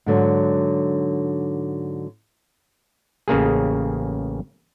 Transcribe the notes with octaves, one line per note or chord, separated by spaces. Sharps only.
G#2 D3 F#3
A1 C#3 A#3 G#4